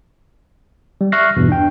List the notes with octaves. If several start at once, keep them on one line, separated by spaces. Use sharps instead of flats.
G3
E5 C#6 F6 F#6 A#6 C7
E2 G2 B2 E3
D4 G5